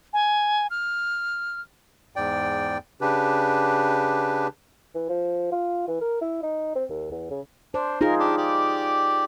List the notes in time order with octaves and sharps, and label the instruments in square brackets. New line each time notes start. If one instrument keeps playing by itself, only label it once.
[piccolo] G#5
F6
[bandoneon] E2 G#2 D5 G5
C#3 D4 G4 B4
[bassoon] E3
F3
F4
E3
A#4
E4
D#4
C4
D#2
E2
C#3
[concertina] D4 [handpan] C5
[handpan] D#4 F4 G#4 [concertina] A#4
[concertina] D4 G4
G4 D5